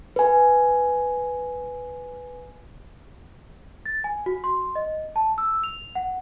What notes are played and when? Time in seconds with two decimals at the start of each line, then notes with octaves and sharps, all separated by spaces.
0.16 B4 G#5
3.86 A6
4.04 G#5
4.26 F#4
4.44 C6
4.75 D#5
5.16 A5
5.38 E6
5.64 F7
5.95 F#5